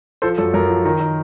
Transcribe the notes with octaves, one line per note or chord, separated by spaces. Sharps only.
F3 A4 C5
F#2 A4
F#2 A#4
F3
D#3 A#4
D#3